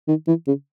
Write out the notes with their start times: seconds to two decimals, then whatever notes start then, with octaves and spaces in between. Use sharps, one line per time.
0.08 D#3
0.28 E3
0.47 C#3